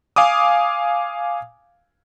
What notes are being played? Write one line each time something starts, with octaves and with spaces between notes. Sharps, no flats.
F5 G#5 D6 D#6